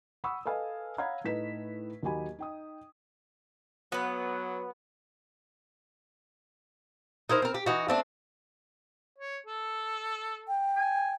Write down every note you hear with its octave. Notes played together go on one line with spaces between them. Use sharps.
F#5 B5 C#6 D#6 E6
A4 B4 D#5 F5 G#5
C#5 F5 F#5 A#5 B5 G#6
A2 A3 D#4 B4 B6 E7
D#2 F#3 D#4 G4 G#5 B5
D#4 G5 D#6
F#3 B3 B4
D#4 E4 A#4 C5
C4 A#4
G4
E3 D#4 F#4
A3 C4 D4
C#5
A4
G5
G#5